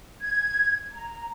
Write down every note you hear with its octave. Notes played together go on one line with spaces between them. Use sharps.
G#6
A#5